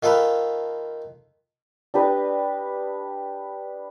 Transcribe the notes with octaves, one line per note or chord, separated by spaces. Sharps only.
D#3 F4 A4 B4
D4 G4 B4 D#5